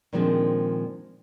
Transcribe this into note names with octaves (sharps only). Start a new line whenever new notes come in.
A#2 D#3 F3 G#3 C4 D4